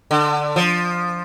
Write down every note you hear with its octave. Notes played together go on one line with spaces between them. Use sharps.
D3
F3